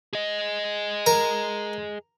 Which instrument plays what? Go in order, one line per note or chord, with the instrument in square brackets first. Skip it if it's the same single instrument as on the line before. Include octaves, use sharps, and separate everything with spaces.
[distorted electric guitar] G#4 D#5
[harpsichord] A#4